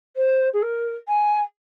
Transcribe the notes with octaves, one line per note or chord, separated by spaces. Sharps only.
C5
G#4
A#4
G#5